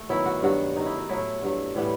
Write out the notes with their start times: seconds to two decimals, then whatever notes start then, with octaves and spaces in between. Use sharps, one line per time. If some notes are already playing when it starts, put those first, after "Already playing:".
Already playing: A3
0.09 D#3 F#3 B3 E4
0.26 F#4
0.42 G2 D#3 F#3 F#4
0.75 D#3 A3 D#4
0.86 E4
0.98 D#4
1.09 A2 F#3 A3 E4
1.42 G2 F#3 A3
1.75 A2 E3 G3 B3